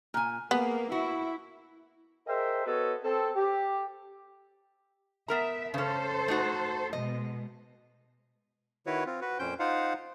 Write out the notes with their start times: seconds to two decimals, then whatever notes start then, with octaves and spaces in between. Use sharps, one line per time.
0.14 A#2 G#5
0.51 A#3 B3 G#4
0.92 E4 F#4
2.27 G#4 A#4 C5 D#5 E5 G5
2.66 B3 F#4 A4 B4 C#5 D#5
3.04 C4 A4
3.36 G4
5.28 B3 A#4 E5 A#5
5.74 C#3 C#4 A4 C5
6.28 A3 D#4 F#4
6.93 B2 G#3 D#5
8.86 D#3 E4 F#4 B4 C#5
9.06 C4 F4
9.21 F#4 B4
9.39 F2 A#2 C#4 C5 G5 G6
9.59 D#4 F4 C5 F5 F#5